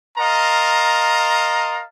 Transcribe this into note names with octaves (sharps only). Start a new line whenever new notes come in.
A#4 D#5 F5 A5 A#5 C6